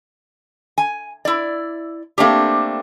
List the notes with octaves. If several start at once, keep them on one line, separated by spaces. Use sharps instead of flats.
G#5
E4 D5
A3 A#3 C4 D4 G4